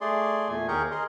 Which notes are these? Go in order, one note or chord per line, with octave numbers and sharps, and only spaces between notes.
A3 G#4 D5 C6
E2 A#2 A3 G#5
D#2 G4 G#4 A#4 C#6 G6
G#4 A#4 D#5 C6